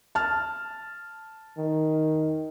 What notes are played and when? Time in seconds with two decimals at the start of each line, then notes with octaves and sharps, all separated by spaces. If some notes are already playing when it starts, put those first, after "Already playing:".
0.15 A5 F6
1.58 D#3